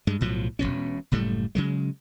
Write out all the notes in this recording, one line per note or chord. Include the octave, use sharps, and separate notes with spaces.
G2 G#3
B1 A2 F3 F#3
E1 A#1 B2 C#4
F#1 A2 G3 A3
C#3 F#3 G#3